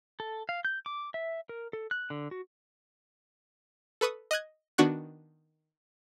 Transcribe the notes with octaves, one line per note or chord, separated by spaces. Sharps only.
A4
F5
G6
D6
E5
A#4
A4
F#6
D3
F#4
A4 B4 C#6 D#6
D#5 D#6 F#6 G#6
D#3 B3 D4 F#4 C#6 F#6